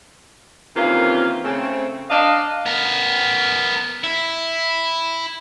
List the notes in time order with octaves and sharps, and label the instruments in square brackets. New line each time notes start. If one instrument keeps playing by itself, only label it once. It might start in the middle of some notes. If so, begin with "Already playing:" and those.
[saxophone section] C3 D#3 E3 A#3 C#4 F4
C#3 A3 C4
D4 D#5 F5
[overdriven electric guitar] B3 A#4
E4